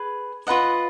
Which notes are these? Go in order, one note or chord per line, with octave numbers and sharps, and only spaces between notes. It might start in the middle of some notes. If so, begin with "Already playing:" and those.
Already playing: G#4 B4
F4 B4 D#5 F#5